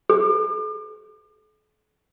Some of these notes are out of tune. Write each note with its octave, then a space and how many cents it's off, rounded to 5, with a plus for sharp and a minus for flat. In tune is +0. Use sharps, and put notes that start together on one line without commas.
A4 -45